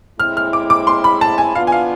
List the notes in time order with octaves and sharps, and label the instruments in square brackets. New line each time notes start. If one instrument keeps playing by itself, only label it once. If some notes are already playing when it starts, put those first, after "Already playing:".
[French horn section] A2 G#3 C4 E4 [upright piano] F6
[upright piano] F6
D6
D6
C6
B5
A5
G#5
[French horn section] E3 B3 D4 F4 [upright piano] F5
[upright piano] G#5
F5